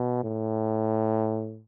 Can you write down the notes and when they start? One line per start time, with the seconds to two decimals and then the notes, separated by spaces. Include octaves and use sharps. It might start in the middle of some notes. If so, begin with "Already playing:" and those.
Already playing: B2
0.24 A2